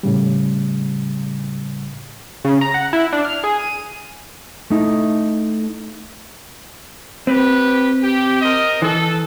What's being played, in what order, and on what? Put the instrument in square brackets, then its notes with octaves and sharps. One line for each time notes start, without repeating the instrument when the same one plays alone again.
[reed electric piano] A2 C#3 G3
[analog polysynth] C#3
A#5
F#5
E4
D4
F6
G#4
D#7
[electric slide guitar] A3 D#4 E4
[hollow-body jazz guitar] C4 [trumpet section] G4 B4
[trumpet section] G4
A#4 C5 D#5
[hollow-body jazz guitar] E3 [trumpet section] A4